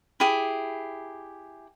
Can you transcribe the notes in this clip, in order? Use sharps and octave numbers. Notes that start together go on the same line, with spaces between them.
E4 G4 G#4